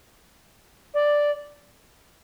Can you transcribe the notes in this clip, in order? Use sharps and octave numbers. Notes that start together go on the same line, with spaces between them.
D5